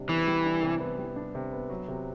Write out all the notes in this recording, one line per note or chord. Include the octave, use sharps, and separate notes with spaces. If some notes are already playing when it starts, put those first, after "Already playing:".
Already playing: C3 G3 D4
E3 B3
G3
D4
C3
B3
G3
D4
C3
B3
F#3
C3